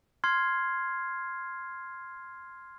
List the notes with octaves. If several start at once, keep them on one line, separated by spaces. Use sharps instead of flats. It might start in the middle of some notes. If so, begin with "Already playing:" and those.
C6 F6 G#6 C7